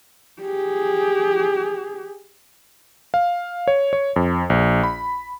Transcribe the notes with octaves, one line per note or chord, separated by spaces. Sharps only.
G4 G#4
F5
C#5
C#5
F2
A#1
B5